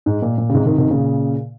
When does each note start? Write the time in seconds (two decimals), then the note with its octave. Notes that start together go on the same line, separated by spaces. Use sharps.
0.06 G#2
0.22 A#2
0.38 A#2
0.49 C#3
0.54 G#2 C3
0.65 C3 D#3
0.78 C3 D#3
0.90 A#2 C#3